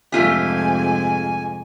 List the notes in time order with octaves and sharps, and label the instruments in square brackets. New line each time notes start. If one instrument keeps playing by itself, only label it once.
[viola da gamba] F2 G#2 C3 [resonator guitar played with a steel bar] A3 F4 G4 [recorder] G#5